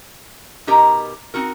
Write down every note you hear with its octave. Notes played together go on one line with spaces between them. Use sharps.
B2 D#4 G4 A#4 D#5 A#5
C4 D#4 F#4 A#4